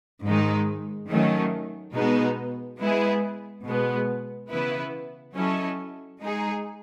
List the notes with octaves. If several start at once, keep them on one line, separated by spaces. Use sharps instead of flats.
G#2 D#3 G#3 D#4
D#3 F#3 A3 C#4
B2 G#3 B3 D#4
G#3 B3 E4 G#4
B2 G#3 B3
C#3 E3 B3 E4 B4
F#3 C#4 E4 A4 D#5
G#3 D#4 G#4